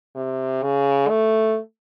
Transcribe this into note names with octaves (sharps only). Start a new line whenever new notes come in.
C3
C#3
A3